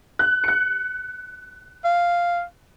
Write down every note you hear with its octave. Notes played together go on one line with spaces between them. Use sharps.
F#6
F#6 C#7
F5